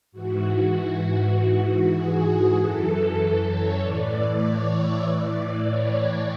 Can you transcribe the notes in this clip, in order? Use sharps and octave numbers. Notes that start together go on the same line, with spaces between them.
G#2 E3 F#4
F#4
G#2 E3 F#4
F#4
G#4
G#4
F#2 E3 A4
C#5
A2 E3 D5
C#5
E5
A2 E3 D5
D5
C#5